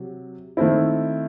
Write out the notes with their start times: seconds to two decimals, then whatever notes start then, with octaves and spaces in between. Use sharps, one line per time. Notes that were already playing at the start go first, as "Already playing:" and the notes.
Already playing: C3 F#3
0.57 D#3 A3 C4 E4